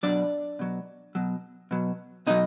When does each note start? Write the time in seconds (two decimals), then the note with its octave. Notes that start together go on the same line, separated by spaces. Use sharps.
0.03 B2 F#3 D4 D5
0.59 B2 F#3
1.15 B2 F#3
1.71 B2 F#3
2.27 B2 F#3 D#4 D#5